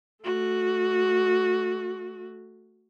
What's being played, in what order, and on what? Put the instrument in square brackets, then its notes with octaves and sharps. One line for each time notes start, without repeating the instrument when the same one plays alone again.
[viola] A3 F#4